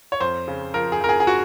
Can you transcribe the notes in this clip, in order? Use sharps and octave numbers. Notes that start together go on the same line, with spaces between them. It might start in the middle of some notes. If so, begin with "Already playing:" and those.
C#5
F2 C5
C#3
F3 A#4
G#4
F2 A#4
G#4
G#4
F#4